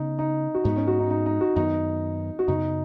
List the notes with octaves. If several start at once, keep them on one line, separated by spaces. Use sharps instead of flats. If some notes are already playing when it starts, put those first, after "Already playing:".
Already playing: C#3 B3 D#4
D#4
F#4
G#2 G#3 B3 D#4
C#4
F#4
D#4
D#4
D#4
F#4
F#2 D#3 B3 D#4
F#4
F#2 C#3 B3 D#4